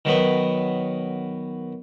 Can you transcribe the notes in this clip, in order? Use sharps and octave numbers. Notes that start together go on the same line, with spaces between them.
D#3 F#3 B3